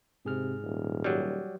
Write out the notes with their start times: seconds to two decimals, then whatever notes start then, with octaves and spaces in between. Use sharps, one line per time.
0.25 G#2 C3 G#4 F6
0.63 D#1
1.04 F#3 G3